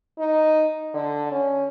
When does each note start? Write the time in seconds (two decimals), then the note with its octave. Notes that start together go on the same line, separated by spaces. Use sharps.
0.19 D#4
0.94 D3
1.32 C#4